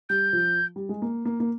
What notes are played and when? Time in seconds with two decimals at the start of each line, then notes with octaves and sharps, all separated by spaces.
0.09 G3 G6
0.33 F3
0.76 G3
0.89 G#3
1.02 A#3
1.25 A#3
1.40 A#3